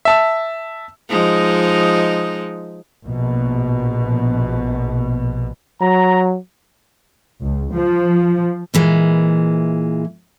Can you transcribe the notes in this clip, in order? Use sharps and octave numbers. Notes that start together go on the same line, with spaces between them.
E5 A5 E6
F3 G#3 D#4
A#1 B2
F#3 A#5
C#2
F3
A#2 E3 G#3